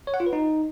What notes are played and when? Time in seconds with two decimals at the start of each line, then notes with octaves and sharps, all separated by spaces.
0.07 C#5
0.14 F#5
0.20 F4
0.26 B4
0.33 D#4